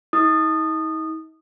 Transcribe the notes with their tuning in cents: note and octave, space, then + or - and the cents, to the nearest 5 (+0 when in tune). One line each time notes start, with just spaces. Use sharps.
D#4 +40 D#6 -20